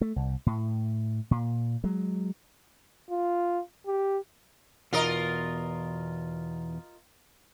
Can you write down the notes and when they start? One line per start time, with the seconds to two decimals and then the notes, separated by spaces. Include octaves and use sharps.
0.01 A3
0.16 C2
0.46 A2
1.31 A#2
1.84 F#3 G#3
3.10 F4
3.86 G4
4.93 E2 B2 F4 A#4 D#5